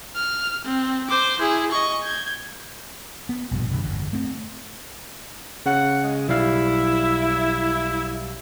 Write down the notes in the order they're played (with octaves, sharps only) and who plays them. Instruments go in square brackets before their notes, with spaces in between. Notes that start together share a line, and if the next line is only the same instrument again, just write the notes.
[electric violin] F6
C4
C5 D6
E4 G#4
D#5 C#6
G6 G#6
[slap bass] B3
A#1 G2 B2
D2 G2 C3 E3
G1 F2 G#2
A3 C4
[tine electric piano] C#3 [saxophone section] F#5
[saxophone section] G#3
[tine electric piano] B1 G3 F5 [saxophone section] E4